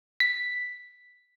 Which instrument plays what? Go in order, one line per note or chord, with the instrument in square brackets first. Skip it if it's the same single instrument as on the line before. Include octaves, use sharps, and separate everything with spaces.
[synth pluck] B6